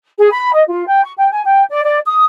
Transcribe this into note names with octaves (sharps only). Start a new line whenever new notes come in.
G#4
B5
D#5
F4
G5
C#6
G5
G#5
G5
D5
D5
D#6